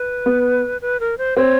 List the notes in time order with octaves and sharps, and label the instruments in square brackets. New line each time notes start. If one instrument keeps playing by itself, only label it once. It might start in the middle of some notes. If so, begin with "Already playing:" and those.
Already playing: [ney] B4
[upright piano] B3
[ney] B4
A#4
C5
[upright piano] C4 [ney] C#5